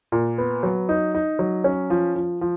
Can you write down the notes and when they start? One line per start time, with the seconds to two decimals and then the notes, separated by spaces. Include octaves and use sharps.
0.12 A#2
0.38 B3
0.63 F#3
0.89 D#4
1.15 D#4
1.39 F#3
1.64 C#4
1.90 F3
2.15 F3
2.41 F3